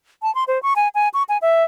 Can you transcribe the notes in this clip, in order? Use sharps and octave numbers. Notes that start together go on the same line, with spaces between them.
A5
C6
C5
C#6
G#5
G#5
C#6
G#5
E5